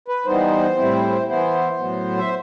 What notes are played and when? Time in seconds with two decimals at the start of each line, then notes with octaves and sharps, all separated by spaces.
0.08 B4
0.26 E3 G3 B3 D#4 C5
0.77 A2 G3 C4 E4
1.27 E3 B3 E4 C5
1.78 A2 F#3 B3
2.18 E5